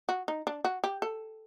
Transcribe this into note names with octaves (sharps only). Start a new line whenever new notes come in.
F#4
D#4
D4
F#4
G4
A4